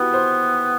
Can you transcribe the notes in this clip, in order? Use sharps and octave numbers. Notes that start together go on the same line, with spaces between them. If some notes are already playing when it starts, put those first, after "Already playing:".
Already playing: B3 E4 F#4 G4 B4
C5